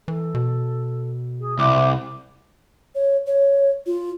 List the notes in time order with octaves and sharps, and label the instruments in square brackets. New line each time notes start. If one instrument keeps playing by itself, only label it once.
[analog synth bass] E3 [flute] A4
[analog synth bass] B2
[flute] G#4
[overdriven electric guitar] C2 [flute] E5 [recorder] D6
[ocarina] C#5
C#5
F4